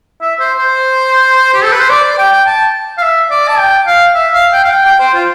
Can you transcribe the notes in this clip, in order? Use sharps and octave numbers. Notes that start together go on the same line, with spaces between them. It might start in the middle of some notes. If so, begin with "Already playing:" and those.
E5
C5
C5
G4
A4
B4
C5
D5
D5
G5
G5
A5
F5
E5
D5
A5
G5
F5
E5
F5
G5
F5
G5
G5
C5
F4